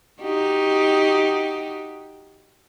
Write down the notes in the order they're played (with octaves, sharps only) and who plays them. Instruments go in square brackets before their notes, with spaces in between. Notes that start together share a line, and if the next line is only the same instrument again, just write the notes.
[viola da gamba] D#4 F#4 G4